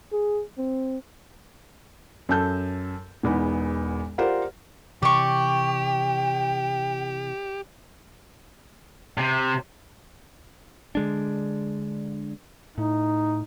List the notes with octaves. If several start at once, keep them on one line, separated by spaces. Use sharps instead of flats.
G#4
C4
F#2 A4 A5 G6
E1 E2 B3 D#4
F4 G4 A#4 C5 D5 F#5
C3 E3 G4 D5 G5 C#6
C3
D3 G#3 D4
A2 D#4